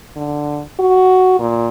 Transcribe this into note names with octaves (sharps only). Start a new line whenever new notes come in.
D3
F#4
A#2